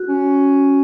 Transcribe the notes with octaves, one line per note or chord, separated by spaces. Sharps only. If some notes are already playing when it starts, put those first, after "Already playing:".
Already playing: F#4
C#4